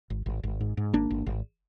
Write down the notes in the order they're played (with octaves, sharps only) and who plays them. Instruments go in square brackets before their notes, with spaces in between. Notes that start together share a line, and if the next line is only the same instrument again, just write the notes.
[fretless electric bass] G#1
G#1
G#1
G#2
G#2
G#1 A#3 D4
G#1
G#1